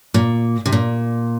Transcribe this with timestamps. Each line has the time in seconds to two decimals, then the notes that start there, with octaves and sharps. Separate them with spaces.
0.14 A#2
0.66 C3
0.72 A#2